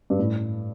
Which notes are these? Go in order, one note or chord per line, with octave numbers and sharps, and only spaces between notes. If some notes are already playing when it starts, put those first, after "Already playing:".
G2
A2